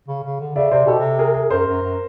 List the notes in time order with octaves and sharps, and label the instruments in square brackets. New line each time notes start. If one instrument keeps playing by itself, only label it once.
[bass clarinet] C#3
C#3
D3
[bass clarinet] C#3 [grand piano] D5 E5
[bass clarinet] C3 [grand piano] C5 D5
[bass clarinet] B2 [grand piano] G4 A4
[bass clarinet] C3
[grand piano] G#4 A#4
G#4 A#4
[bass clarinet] F#2 [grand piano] A#4 C5
[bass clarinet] F#2
F#2